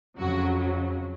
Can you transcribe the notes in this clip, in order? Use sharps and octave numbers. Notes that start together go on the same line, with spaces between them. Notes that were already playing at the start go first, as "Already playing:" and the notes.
F2 C#3 F#3 F#4